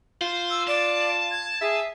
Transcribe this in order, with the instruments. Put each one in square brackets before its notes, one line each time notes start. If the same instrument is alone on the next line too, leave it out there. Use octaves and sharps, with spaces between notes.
[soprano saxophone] F4 [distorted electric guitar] C5
[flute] E6
[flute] D5 [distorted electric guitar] A5
[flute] G#6
[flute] G#4 [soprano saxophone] E5